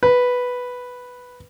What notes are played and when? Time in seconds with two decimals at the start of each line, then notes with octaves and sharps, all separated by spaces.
0.03 B4